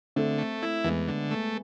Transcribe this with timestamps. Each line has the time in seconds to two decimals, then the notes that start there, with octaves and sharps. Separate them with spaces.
0.16 D3 A3 C4
0.38 A3
0.63 E4
0.84 E2 G#3 B3
1.08 D3
1.31 A3